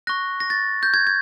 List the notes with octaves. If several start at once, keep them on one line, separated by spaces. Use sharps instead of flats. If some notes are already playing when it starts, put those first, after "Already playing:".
C#6 F#6 A#6
A#6
A6
G6
G#6
G#6